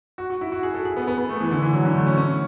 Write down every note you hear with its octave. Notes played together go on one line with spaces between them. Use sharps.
F#4
F#4
E4
F#4
G#4
A4
G#4
B3
B3
B3
A3
E3
D3
E3
F#3
D3
A3
C#4
C#4